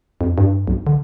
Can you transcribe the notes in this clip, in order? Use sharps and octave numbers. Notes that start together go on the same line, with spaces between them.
F2
G2
B1
D3